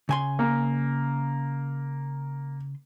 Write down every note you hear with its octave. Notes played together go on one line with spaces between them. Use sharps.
C#3 G#5 C6
A#3